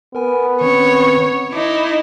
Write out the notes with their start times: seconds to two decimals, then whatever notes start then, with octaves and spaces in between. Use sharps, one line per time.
0.15 B3 A#4 G#5
0.61 D#3 C4 C#4 C#5
1.53 D#4 E4 D6